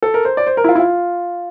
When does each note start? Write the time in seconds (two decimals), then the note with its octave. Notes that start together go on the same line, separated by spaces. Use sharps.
0.02 A4
0.14 A#4
0.25 C5
0.37 D5
0.47 C5
0.57 A#4
0.64 E4
0.69 F4
0.75 E4
0.80 F4